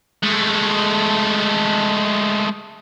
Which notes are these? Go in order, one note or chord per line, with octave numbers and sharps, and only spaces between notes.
G#3 A3